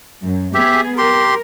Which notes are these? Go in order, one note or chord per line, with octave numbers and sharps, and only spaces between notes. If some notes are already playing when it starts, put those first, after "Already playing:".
F#2
B3 G4 G#4 E5
G4 A#4 C6